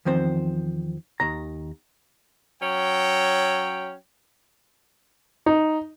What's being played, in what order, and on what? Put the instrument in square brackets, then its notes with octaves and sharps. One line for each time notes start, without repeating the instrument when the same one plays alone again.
[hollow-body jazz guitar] E2 D#3 F3 C4 C5
D#2 D#3 A#5
[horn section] F#3 C#4 C#5 G5
[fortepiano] D#4